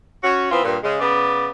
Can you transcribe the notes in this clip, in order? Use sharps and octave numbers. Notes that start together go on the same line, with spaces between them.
C#4 F#4
E3 B3 C4 F4
G2 A#2
C#3 G#3
C#3 B3 D5